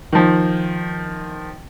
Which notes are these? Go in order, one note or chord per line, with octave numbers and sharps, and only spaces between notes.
D#3 F3